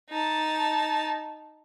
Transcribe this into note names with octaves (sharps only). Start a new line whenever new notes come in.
D#4 A5